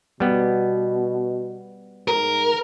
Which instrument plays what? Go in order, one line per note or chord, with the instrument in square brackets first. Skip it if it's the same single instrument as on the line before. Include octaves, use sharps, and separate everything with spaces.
[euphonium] B2 [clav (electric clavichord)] G3 B3
[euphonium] G#2 [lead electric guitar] A#4